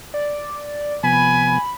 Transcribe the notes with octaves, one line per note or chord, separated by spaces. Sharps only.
D5
C3 F3 B3 G#5 B5